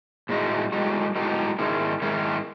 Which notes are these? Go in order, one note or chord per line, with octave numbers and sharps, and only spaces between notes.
A2 G#3 D#4 F#4
A2 G#3 D#4 F#4
A2 G#3 D#4 F#4
G#2 D#3 G#3 C#4 E4
G#2 D#3 G#3 C#4 E4